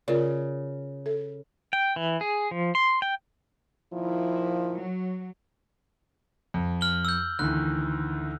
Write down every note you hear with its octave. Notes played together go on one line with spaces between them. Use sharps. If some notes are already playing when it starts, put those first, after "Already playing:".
C#3 F4 A#4 D5
A4
G5
E3
G#4
F3
C6
G5
A#2 D#3 F3 E4
F#3
F2
F6 F#7 G7
E6 G6
D2 D#3 E3 F#6